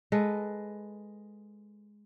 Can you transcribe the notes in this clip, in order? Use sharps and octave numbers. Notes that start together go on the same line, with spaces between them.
G#3 A4 B4